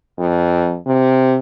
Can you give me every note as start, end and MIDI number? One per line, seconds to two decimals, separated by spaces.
0.19 0.77 41
0.87 1.38 48